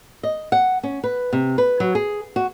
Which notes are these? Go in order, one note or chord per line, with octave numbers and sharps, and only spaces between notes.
D#5
F#5
C#4
B4
C3
B4
F#3
G#4
F#4